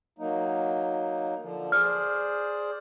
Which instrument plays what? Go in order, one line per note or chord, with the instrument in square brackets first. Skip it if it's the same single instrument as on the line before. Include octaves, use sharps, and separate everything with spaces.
[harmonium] F#3 A#3 D#4
D3 F3
[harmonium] G#4 C5 D5 [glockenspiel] F6